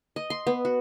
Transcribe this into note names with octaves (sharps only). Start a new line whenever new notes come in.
D#5
C6
B3
F#4